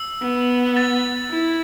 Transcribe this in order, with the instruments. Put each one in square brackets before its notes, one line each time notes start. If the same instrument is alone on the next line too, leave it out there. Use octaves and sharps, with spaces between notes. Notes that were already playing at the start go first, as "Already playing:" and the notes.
Already playing: [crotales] E6
[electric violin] B3
[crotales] A6
[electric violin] E4